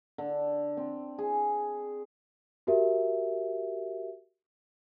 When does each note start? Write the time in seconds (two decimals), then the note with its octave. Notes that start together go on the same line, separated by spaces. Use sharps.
0.18 D3
0.77 C4
1.18 G#4
2.67 F#4 G4 A#4 E5